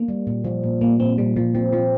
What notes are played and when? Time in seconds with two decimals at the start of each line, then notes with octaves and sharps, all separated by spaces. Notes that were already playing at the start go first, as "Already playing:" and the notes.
Already playing: A#3
0.08 G3
0.27 A#2
0.44 F3
0.64 A#2
0.81 A#2 A#3
0.99 A#2 C4
1.18 A#2 G3
1.36 A#2 F3
1.55 F3 C4
1.73 F3 C4